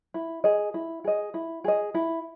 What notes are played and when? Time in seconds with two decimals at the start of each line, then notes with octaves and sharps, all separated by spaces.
0.14 E4
0.44 G#4 D#5
0.74 E4
1.04 G#4 D#5
1.34 E4
1.64 G#4 D#5
1.94 E4